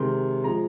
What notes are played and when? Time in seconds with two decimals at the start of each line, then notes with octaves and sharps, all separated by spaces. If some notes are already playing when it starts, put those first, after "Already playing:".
Already playing: C3 D#3 G#3 C6
0.44 F3 G#3 A#5